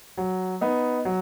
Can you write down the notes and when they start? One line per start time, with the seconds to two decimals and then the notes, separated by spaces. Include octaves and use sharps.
0.18 F#3
0.61 B3 D#4
1.05 F#3